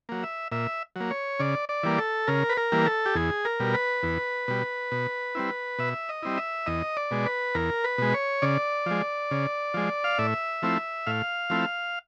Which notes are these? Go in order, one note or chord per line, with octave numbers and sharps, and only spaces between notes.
F#3 A#3
E5
A#2 E5
F#3 A#3
C#5
C#3 D5
D5
E3 G3 A#3
A4
C#3 A#4
B4
A#4
E3 G3 A#3
A4
G4
E2 G#4
A#4
B2 G3
B4
E2
B2 G3
B2
G3 C4 E4
B2 E5
D#5
G3 C4 E4
E5
E2 D#5
D5
B2 G#3
B4
E2 A#4
B4
B2 G#3
C#5
C#3 D5
F3 G#3
C#3
F3 G#3
F5
A2 E5
F3 A3 C4 E4
A2 F5
F3 A3 C4 E4